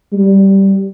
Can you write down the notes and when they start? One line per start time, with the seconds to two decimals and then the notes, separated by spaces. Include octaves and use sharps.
0.13 G3